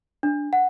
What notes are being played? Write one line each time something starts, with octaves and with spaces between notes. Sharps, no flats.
D4
F#5